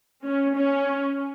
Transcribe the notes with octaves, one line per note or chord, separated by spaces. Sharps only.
C#4
C#4